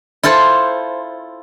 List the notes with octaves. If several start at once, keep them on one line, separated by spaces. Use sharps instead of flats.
E4 F4 A4 C5